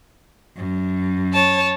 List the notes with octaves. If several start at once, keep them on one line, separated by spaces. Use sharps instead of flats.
F#2
C#5 A5